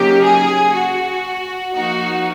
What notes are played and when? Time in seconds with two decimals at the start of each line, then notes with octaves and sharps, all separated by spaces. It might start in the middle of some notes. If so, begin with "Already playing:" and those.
Already playing: C#3 F#3 A#3 D#4 G4
0.22 G#4
0.73 F#4
1.74 F3 A#3 D#4 F#4